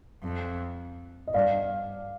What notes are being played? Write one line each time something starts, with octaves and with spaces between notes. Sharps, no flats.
F2
D#5
G2 D5 F5